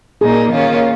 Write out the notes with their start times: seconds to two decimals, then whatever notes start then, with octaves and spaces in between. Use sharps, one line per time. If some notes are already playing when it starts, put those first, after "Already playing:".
0.21 A#2 A#3 D#4 G#4
0.51 D#3 A#3 C#4 F4